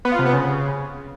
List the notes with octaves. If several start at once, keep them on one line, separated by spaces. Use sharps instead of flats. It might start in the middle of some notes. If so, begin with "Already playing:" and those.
B3
F4
C3
B3
C#3